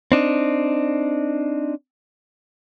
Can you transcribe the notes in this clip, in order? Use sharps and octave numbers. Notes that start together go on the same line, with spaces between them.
C4 D4 D#4